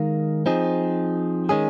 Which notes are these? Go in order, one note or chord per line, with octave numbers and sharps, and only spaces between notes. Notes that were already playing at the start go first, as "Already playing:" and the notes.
Already playing: D#3 G#3 D#4 A#4 F5
F3 C4 D#4 G#4
D#3 G#3 C#4 G#4